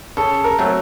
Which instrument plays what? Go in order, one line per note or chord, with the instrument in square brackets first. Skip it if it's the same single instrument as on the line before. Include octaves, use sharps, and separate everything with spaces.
[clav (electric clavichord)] C#3 [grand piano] A4
[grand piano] A#4
[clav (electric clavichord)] F#3 A3 C4